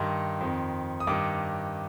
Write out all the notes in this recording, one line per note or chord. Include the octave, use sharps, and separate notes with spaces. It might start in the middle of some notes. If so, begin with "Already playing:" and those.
Already playing: G2 D#3 C6
F2 D#3
D#6
G2 D#3 D6